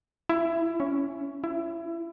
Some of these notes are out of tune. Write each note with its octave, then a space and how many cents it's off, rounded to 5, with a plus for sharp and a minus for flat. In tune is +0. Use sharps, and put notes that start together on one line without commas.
E4 +20
C#4 +10
E4 +25